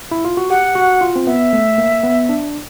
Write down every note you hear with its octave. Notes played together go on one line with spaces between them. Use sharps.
E4
F4
F#4
G4 F#5
F#4
F4
C4
B3 E5
A3
A#3
B3
D4